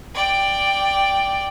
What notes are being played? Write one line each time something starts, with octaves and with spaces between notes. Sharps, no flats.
D5 G5